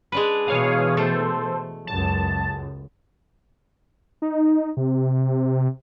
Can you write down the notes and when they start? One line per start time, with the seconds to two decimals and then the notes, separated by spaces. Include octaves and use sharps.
0.12 G#3 D4 B4
0.46 B2 E3 C#5 F5 D#6
0.97 A3 A4 C5
1.87 C#2 F#2 A5
4.22 D#4
4.77 C3